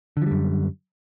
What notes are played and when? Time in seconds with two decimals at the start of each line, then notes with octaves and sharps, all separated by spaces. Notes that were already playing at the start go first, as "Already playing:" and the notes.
0.17 D3
0.22 F3
0.26 G3
0.31 F#2